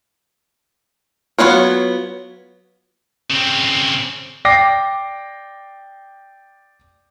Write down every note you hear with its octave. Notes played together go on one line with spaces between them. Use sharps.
F#3 B3 C#4 F4 C#5
C#3 C4
D5 G5 D6 A#6 C7